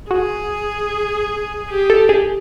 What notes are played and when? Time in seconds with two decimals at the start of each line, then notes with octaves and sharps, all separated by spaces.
0.10 F#4 G#4
1.70 G4
1.90 A4
2.09 G#4